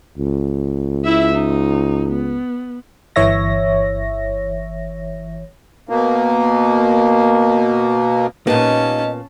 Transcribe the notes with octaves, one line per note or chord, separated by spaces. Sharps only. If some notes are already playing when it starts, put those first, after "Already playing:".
C#2
E4 E5
D#4
B3
G1 E3 C#5 E5 A#6
B2 A#3
A#2 A#3 B3 C#4 D#4 G4 D#5 A5